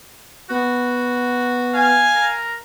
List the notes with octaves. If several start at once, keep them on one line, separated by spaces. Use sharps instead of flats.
B3 F#4
F5 G#5
A#4